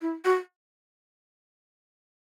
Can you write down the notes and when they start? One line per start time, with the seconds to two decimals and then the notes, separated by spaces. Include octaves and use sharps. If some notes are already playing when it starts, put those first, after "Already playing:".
0.01 E4
0.25 F#4